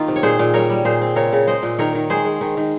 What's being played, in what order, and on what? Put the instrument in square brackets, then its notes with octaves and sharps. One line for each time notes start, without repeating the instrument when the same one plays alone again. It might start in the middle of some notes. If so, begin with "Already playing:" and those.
Already playing: [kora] D#3 A#3 D#4 F4
C3
C#5
A#2 G#4 C5
A#2
G3 A#4 C#5
G3
A#2 G#4 C5
C4
C#3 A#4 C#5
C#3
G#3 C5 D#5
A#2
D#3 A#4 C#5
D#3
G#3 G#4 C5
G#3
D#3
D#3